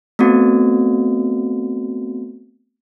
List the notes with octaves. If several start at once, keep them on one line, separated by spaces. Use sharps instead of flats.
A3 B3 C4 F#4